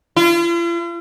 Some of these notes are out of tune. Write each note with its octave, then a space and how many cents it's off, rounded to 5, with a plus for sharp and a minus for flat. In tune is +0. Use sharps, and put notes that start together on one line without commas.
F4 -45